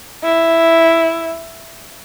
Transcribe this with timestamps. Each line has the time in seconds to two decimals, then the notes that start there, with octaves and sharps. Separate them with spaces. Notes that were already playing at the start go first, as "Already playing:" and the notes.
0.24 E4